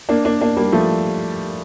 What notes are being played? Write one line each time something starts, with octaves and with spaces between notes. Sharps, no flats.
A#3 D4
A#3 D4
A#3 D4
G3 A#3
F3 A3